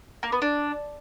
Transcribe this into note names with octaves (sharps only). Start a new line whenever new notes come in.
A#3
B3
D4